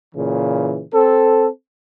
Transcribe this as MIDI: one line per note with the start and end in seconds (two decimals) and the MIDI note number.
0.14 0.82 46
0.14 0.82 49
0.14 0.82 52
0.93 1.46 60
0.93 1.46 69